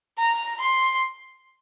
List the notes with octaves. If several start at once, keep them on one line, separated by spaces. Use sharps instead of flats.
A#5
C6